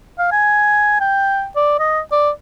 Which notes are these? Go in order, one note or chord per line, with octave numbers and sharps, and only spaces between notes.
F5
G#5
G5
D5
D#5
D5